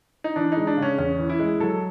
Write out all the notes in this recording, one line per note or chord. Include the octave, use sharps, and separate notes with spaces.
D#4
E3 D4
G#3 D#4
D4
C#3
C#4
E2 C#4
E3
E4
G#3
F#3 A4